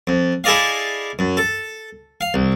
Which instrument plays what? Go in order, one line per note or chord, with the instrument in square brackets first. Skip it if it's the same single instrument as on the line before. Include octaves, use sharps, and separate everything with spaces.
[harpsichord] F2
E4 G#4 A4 D5 D#5 F5
F#2
A4
F5
C2